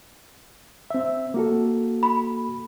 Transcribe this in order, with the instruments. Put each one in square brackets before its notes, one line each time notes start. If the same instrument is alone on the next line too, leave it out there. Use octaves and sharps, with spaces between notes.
[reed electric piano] C4 E5
A#3 F#4 A4
[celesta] B5